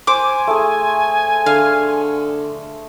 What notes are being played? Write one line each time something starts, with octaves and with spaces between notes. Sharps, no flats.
C5 G#5 D6
A3 G#4
D3 F5